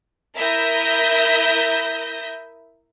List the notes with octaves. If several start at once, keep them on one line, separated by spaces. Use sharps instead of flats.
E4 A#4 E5 D#6 G6 A#6